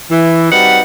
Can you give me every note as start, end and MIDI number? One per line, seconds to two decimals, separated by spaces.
0.11 0.50 52
0.51 0.80 55
0.51 0.80 60
0.51 0.80 63
0.51 0.80 66
0.51 0.80 71
0.51 0.80 78